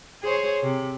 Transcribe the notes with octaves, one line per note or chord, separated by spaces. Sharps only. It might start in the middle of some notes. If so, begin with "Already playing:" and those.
G#4 C5 C#5
C3